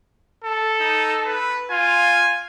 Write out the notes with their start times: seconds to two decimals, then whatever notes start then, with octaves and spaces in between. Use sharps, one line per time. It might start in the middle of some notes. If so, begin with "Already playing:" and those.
0.44 A4
0.81 D#4
1.26 B4
1.71 F4 G#5